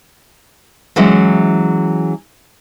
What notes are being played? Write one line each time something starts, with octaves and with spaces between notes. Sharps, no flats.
E3 F#3 G#3 C#4